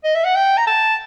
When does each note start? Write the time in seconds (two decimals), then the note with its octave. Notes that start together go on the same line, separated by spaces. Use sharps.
0.04 D#5
0.15 E5
0.25 F#5
0.35 G5
0.57 A#5
0.67 A5